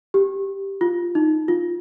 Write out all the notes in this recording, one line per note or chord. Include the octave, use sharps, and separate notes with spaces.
G4
F4
D#4
F4